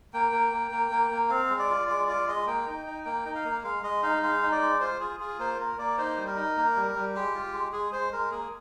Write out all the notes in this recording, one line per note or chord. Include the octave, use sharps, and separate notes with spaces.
A#3 G5
A#3
A#3
A#3
A#3
A#3
C4 F5
G#3
D5
F4
G#3 D5
F4 D5
G#3 D#5
A#3 G5
D#4
D#4
A#3 G5
D#4
F5
A#3
G#3 F5
G#3 D#5
D#4 F5
G#3 F5
D#4
D5
G#3
F4 C5
F4 G#4
F4 G#4
A#3 C5
A#3 A#4
A#3 D5
D#4 C5
G3
A#4
D#4
A#3
G3
G3
G#3 G4
F4
G#3
G#3 G#4
G#3 C5
G#3 A#4
A#3 G#4